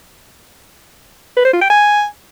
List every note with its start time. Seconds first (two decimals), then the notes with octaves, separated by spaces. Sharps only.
1.36 B4
1.45 C5
1.53 F4
1.61 G5
1.70 G#5